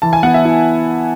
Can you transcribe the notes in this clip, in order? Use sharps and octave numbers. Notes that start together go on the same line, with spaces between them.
E3 A5
G#5
B3 F#5
E5
E4